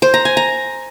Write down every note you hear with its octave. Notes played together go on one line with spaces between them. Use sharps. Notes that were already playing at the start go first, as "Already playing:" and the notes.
C5
A#5
G#5
A#5